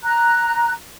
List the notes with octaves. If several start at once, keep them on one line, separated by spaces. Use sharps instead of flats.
A#5 F#6